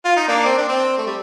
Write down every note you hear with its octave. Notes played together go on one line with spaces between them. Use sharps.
F4
D#4
A#3 D4
C4
D4
C4
A3
G3